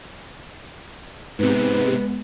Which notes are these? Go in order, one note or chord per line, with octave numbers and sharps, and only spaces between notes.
G#2 C3 G#3 B3 B4